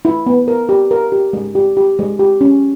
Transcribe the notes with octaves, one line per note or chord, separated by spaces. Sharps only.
E4
B3
A#4
G4
A#4
G4
G#3
G4
G4
G#3
G4
C#4